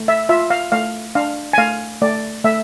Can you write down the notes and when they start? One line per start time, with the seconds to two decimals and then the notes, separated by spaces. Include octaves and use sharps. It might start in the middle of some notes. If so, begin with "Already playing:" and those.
Already playing: A3
0.08 E5
0.29 F4 E5
0.50 F5
0.72 A3 F5
1.15 D4 F5
1.53 G#5
1.58 A3 F5
2.02 A3 D5
2.44 A3 E5